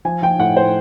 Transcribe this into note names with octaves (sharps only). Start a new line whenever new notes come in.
F3 G#5
F3 G5
A2 F#5
A2 C5